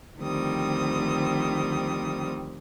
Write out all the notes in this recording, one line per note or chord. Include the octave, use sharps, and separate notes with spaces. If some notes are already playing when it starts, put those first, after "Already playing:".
D2 D#3 F3 G3 C4 D#6